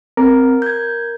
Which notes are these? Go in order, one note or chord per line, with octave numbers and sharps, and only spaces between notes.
C4 A#4
G6 G#6